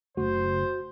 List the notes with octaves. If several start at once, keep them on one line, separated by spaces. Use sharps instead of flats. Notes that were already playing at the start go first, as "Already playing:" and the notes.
F#1 C#3 A3 F#4 C5